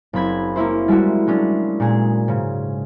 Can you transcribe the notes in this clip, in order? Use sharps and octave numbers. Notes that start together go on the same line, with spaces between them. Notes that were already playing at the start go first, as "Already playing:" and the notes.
F#1 C4 B5 G#6
A#3 C#4 E4 C5
G3 G#3 E4 F#4
F#3 G#3 C#4 D4
A#2 G#4
G#2 C#3